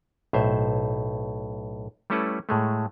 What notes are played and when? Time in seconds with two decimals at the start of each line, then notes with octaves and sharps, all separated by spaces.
0.33 B1 A2 C5 E5
2.10 G3 A3 C#4 E4 A4 B4
2.49 A2 G#3 A3